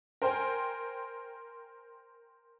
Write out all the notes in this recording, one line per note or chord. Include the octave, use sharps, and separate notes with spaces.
A#4 C5 G5 G#5